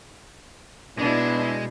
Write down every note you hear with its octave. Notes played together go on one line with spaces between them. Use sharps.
B2 G#3 D4 E4